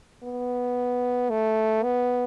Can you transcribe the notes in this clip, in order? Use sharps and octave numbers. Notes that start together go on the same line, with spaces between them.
B3
A3
B3